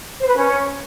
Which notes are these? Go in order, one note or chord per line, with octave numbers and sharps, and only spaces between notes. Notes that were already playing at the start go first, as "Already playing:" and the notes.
C5
B4
C#4